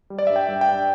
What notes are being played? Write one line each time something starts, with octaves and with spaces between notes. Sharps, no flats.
G3
D5
G2 E5
G5
G2
G5
G2